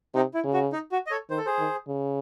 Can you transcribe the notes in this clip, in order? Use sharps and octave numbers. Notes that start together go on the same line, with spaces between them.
C3 D#4
E4
C#3
F#4
D#4
F#4
D#5
A4 C#5
D#3 C5
A4
G#4 C5
D#3
C#3